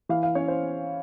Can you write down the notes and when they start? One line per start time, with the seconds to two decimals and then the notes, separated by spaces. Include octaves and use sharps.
0.09 E3 F5
0.23 F5
0.35 C#4 C#5
0.48 C5